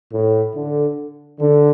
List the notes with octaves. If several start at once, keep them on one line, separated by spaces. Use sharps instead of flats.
A2
D3
D3